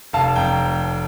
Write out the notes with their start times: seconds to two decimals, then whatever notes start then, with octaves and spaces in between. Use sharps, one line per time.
0.13 F1 F5 A5
0.35 F2 G5 A#5